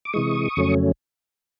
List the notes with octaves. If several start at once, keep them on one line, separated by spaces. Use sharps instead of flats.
D6
C3 E3 G#3 C#6 D#6
F2 C#3 F#3 A3 C#4